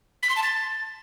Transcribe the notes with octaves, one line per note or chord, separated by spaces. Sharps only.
B6
C6
A5
A6